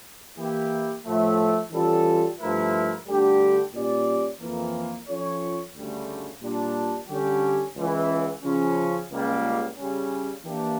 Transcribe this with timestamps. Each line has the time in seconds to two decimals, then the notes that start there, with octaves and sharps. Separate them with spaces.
0.37 E3 A#3 E4 G4
1.05 A2 F3 A3
1.72 E3 G3 C#4 F4 A4
2.39 G2 F3 A3 E4 A#4
3.06 D2 D3 G3 D4 G4
3.74 A#2 G3 C#4 G4 D5
4.40 F2 E3 A#3
5.08 F3 C#4 F4 A4 C#5
5.75 D2 C#3 G3
6.42 A#2 G3 D4
7.09 D3 G3 C#4 G4
7.76 C#2 C#3 E3
8.43 C#3 F3 C#4
9.11 C#2 C#3 G3 A#3
9.77 C#3 G3 C#4
10.45 E3 A#3 D4 G4